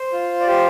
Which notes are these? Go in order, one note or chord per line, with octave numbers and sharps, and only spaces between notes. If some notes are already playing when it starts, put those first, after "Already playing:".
Already playing: C5
F4
D5
G4 C5